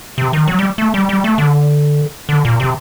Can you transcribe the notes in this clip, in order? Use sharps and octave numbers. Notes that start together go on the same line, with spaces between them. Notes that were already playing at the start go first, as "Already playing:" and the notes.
C3
D#3
F#3
G3
A3
G3
G3
A3
D3
D3
A#2
C3